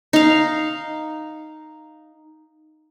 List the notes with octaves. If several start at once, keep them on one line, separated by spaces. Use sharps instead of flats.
D#4 F5